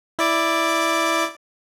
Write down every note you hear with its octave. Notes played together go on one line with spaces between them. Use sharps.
E4 D5 D6